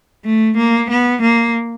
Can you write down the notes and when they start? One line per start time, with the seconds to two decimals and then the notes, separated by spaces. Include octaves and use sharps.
0.24 A3
0.57 A#3
0.90 B3
1.22 A#3